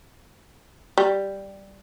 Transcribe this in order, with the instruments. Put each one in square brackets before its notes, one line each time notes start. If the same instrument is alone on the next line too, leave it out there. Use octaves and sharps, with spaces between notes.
[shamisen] G3